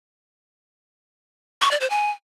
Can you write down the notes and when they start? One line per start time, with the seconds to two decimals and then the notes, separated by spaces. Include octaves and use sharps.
1.62 C#6
1.71 D5
1.81 C5
1.90 G#5